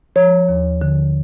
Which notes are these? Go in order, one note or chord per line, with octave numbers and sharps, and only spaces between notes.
F3 C#5
D#2
D3